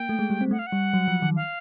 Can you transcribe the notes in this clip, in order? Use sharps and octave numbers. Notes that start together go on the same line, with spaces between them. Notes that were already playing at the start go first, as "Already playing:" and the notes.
Already playing: A#3 G5
A3
G#3
G3
C4
A3 F#5
F5
F#5
G3
F#3
F3
D#3
F5